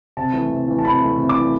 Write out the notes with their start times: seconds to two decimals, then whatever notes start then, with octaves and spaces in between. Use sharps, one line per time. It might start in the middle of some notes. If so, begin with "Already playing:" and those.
0.17 C3 A5
0.33 E3 A3
0.50 C3
0.68 E3 A3
0.79 A5
0.85 C3 B5
1.01 E3 A3
1.18 C3
1.29 D6
1.35 E3 A3